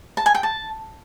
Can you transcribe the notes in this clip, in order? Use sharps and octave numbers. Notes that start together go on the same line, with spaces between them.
A5
G#5
G5
A5